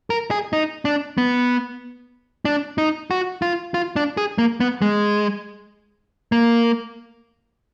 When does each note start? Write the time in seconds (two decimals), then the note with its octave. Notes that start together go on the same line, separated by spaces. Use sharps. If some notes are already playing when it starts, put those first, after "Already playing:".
0.10 A#4
0.31 G#4
0.53 D#4
0.85 D4
1.18 B3
2.45 D4
2.78 D#4
3.11 F#4
3.42 F4
3.74 F4
3.96 D4
4.17 G#4
4.38 A#3
4.60 B3
4.82 G#3
6.32 A#3